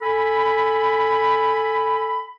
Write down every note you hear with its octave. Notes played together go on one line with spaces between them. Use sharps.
A4 G#5 B5